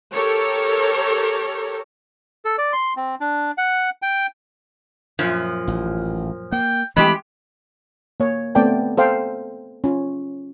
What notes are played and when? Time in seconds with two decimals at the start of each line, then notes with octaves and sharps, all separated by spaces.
0.12 G4 A4 A#4 C#5
2.45 A4
2.58 D5
2.73 C6
2.97 C4
3.20 D4
3.58 F#5
4.02 G5
5.19 F#2 A#2 F3
5.68 A1
6.52 A#3 G5
6.96 E3 G#3 A3 C4 G4 G5 B5
8.20 A#3 C#5
8.55 A3 B3 C4 D5 G5 A5
8.97 A4 C5 F5 G5
9.84 C#4 F4